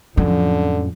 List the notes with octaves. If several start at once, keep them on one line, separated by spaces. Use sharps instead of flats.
F2 A2 D3 F3 F#3 C#4